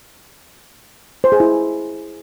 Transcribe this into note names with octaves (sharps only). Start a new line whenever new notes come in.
C5
G#4
E4